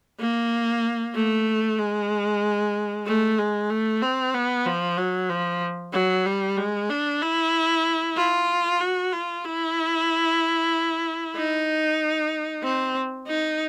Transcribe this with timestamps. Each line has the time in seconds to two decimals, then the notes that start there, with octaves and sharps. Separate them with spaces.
0.20 A#3
1.15 A3
1.79 G#3
3.07 A3
3.39 G#3
3.70 A3
4.02 C4
4.34 B3
4.66 F3
4.97 F#3
5.30 F3
5.93 F#3
6.26 G3
6.57 G#3
6.89 D4
7.22 E4
8.17 F4
8.80 F#4
9.12 F4
9.45 E4
11.36 D#4
12.64 C4
13.28 D#4